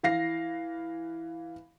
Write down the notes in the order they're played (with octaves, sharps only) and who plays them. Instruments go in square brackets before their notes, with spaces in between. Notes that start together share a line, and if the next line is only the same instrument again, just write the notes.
[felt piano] E3 F5 A#6 C7